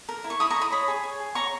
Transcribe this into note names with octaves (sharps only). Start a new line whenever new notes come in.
A#4
E4
C#6
E4 B5 D#6
A#5 C#6
D#5
B5 D#6
C#5 B5 D#6
G#4
C#5
G#4
C#5 A#5 C#6